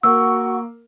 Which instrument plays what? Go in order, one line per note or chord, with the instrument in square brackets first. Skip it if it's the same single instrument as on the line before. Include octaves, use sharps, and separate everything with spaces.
[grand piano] A#3 [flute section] F#4 F#5 C#6 [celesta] E6